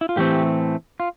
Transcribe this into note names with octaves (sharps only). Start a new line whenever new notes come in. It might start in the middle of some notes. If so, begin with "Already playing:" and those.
E4
F4
A2 E3 A3 C4 G4
F4